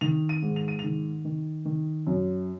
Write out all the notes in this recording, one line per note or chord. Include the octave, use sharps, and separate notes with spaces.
D#3 F7
D#7
G#2
F7
D#7
D#3 F7
D#3
D#3
F#2